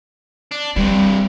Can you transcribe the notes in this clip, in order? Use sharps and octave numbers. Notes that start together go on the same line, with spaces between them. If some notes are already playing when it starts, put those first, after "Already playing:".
D4
G2 C3 G3